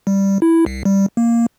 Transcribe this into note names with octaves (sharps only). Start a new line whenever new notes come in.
G3
E4
C2
G3
A#3